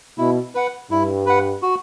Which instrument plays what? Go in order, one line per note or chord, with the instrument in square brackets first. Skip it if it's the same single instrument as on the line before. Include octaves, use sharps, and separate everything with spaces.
[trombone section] B2 [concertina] E4
[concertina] B4 F#5
[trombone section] G2 [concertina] E4
[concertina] B4 F#5
F#4